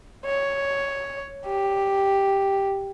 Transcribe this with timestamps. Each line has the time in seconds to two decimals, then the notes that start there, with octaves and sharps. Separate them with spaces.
0.25 C#5
1.46 G4